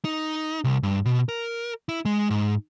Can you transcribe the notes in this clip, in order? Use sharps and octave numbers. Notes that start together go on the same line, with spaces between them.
D#4
C2
G2
B2
A#4
E4
G#3
G#2